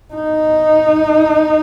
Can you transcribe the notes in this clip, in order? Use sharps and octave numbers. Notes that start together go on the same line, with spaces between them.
D#4